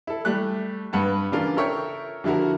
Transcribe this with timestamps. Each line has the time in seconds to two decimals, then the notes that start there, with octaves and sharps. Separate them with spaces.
0.07 E4 A4
0.25 G3 A3 F#6
0.93 G2 B4 F#5 A5
1.32 C#3 E3 D4 F4 A#4
1.56 A4 A#4 C#5 E5 G5
2.24 D3 F3 E4 F#4 A#4